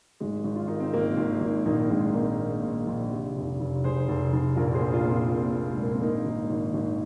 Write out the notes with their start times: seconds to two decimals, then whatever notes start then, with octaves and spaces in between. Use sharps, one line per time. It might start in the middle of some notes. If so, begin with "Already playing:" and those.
0.20 G#1 G#3
0.44 G#1
0.56 F4
0.68 D#3 D#4
0.80 C4
0.93 G#1 A#3
1.17 G#1
1.41 G#1
1.65 A#1 A#3 D#4
1.90 A#1 G#3 C4
2.14 A#2 A#3 D#4
2.39 A#2
2.63 A#2
2.87 A#1
3.12 C3
3.36 F1
3.60 F1
3.84 F1 G#4 C5
4.08 F1
4.33 F1
4.56 A#1 F4 A#4
4.74 G#4 C5
4.80 A#2
4.92 F4 A#4
5.05 A#2
5.10 C4 F4
5.29 A#2
5.53 A#2
5.73 A#1 G#3
5.83 A#3
5.93 C4
6.01 G#1 A#3 D#4
6.26 G#1
6.50 G#1
6.74 G#1